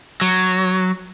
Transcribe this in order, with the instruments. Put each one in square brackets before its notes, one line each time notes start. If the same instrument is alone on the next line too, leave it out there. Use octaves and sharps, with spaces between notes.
[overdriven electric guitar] F#3